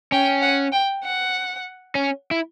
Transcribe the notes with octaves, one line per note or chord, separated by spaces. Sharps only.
C#4 G5
F#5
G5
F#5
C#4
E4